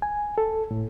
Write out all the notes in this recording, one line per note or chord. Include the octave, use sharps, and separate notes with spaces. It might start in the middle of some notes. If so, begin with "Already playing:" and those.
G#5
A4
A2